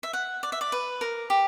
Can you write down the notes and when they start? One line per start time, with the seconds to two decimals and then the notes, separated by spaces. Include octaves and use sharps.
0.03 E5
0.13 F#5
0.43 D5
0.52 E5
0.61 D5
0.72 B4
1.01 A#4
1.30 G4